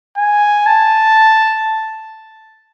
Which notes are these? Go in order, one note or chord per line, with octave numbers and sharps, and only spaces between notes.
G#5
A5